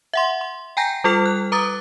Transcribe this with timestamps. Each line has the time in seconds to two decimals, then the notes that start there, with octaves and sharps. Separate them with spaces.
0.13 E5 F#5 C6
0.41 C6
0.77 G5 G#5 A#5 G6 A#6 C7
1.04 G3 F4 A4 F6 C7 F7
1.26 F#6
1.52 B4 A#5 D6 D#6 A6